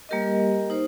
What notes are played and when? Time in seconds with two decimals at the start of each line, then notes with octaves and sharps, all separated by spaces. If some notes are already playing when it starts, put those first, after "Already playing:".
0.09 G3 A#3 G4 A#4 D#5
0.70 D#4 C5